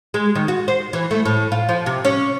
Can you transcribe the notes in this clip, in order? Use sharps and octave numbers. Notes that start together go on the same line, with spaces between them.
G#3
D#3
F#4
C5
E3
A3
A2
F4
F3
C3
C#4